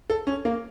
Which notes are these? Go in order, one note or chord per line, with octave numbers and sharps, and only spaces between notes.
A4
C#4
A#3